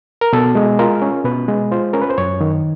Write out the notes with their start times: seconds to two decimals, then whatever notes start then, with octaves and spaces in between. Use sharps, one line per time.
0.21 A#4
0.33 B2 A4
0.55 G#3
0.79 F4 A#4
1.02 C#4
1.25 B2 B4
1.48 G#3
1.72 F4 C5
1.93 C#4 A#4
2.02 B4
2.10 C5
2.18 F#2 C#5
2.41 D#3